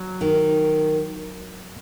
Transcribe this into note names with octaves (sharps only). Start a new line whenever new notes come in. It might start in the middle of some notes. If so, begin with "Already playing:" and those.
Already playing: F#3
D#3